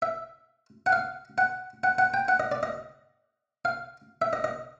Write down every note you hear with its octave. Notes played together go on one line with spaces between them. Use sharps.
E5
F#5
F5
F#5
F#5
F#5
G5
F#5
D#5
D5
D#5
F5
E5
D#5
D#5